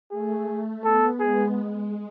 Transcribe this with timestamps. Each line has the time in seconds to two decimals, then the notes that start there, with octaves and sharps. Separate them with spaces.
0.11 A3 G#4
0.83 B3 A4
1.20 G#3 G#4
1.56 G#3